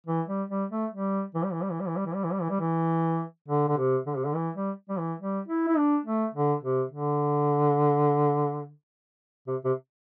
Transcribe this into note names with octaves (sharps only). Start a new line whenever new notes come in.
E3
G3
G3
A3
G3
E3
G3
E3
G3
E3
G3
E3
G3
E3
G3
E3
G3
E3
G3
E3
D3
D3
C3
D3
C3
D3
E3
G3
G3
E3
G3
E4
E4
D4
A3
D3
C3
D3
C3
C3